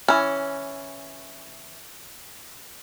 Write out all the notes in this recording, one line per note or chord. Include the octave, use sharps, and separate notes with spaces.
E3 C#4